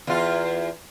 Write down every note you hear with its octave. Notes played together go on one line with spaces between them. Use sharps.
E2 F4